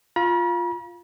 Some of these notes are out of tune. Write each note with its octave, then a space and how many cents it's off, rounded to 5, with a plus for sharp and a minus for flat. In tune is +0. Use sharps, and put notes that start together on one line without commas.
F4 +0 B5 -45